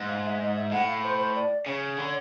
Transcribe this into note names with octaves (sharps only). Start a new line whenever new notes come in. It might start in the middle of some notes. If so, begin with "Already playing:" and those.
Already playing: G#2
F5
E5
D#5
E5
A2 F#5
F5
C5
C5
D5
C#3 C#5
D3